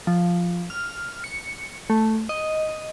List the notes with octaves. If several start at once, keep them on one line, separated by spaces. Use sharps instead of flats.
F3
F6
C#7
A3
D#5